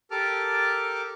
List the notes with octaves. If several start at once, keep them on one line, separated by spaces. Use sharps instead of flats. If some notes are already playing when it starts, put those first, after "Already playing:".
G4 A4 A#4 A5 D6 F6